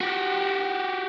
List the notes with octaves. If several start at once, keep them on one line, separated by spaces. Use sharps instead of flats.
F#4 G4